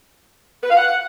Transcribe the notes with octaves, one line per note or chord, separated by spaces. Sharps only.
B4
F5
F#5